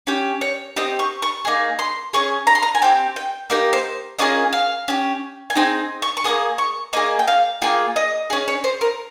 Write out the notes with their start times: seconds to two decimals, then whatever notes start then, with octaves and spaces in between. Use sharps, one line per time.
0.07 C#4 G4
0.41 C#5
0.76 C4 G4 D#5
0.99 C#6
1.22 C#6
1.45 A#3 D#4 G#4
1.79 C6
2.13 C#4 G#4 C#6
2.47 A#5
2.55 C6
2.62 A#5
2.75 G#5
2.82 C4 G4 G5
3.16 G5
3.50 A#3 D#4 G4 A#4
3.73 C5
4.19 A#3 C#4 F4 G#4 D#5
4.53 F5
4.88 C#4 G4
5.50 G#5
5.55 C4 D#4 G#4 G5
6.02 C#6
6.17 C#6
6.24 A#3 F4 G#4 D#6
6.58 C#6
6.93 A#3 C#4 G#4 D#5
7.19 G5
7.27 F5
7.62 A#3 F4 G#4 G5
7.96 D#5
8.30 C#4 G#4 D#5
8.48 C#5
8.64 C5
8.81 A#4